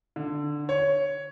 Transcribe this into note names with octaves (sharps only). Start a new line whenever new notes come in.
D3
C#5